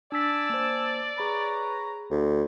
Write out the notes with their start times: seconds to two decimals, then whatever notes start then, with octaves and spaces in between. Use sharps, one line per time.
0.12 D4 D5 G#5 A5 E6 B6
0.50 A#3 C5
1.18 G#4 B4 C#5 A#5 B5
2.11 D2